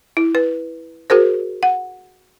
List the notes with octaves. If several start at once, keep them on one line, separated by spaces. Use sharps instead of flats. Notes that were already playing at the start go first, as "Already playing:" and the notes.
E4
B4
F#4 G#4 A#4 C5
F#5